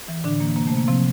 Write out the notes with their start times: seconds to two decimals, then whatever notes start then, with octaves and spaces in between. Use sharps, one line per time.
0.08 E3
0.24 A2 D3 D4
0.40 E3 A#3
0.56 C3 A#3
0.67 A3
0.72 C3
0.78 A#3
0.88 C3 F3 C4